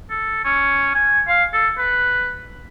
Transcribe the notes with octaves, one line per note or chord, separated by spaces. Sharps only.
A4
C#4
G#5
F5
A4
B4